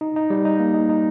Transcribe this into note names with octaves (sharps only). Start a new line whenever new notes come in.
D#4
D#4
G3
D#4
A#3
D#4
D#4